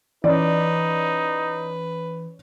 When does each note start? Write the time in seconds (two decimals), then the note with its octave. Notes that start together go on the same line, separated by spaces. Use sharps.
0.24 E3 C#4 D#4 B4 D5